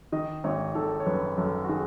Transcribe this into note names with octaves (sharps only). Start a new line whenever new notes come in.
D#3 D#5
G#1 C#5
D#3 A4
C#5
F#2 B4
F#2 A4
F#4
D#3 G#4